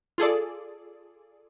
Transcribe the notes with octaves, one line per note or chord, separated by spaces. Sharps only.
F4 G#4 A4 D5